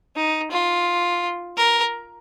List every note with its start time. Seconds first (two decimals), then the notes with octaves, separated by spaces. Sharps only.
0.16 D#4
0.51 F4
1.57 A#4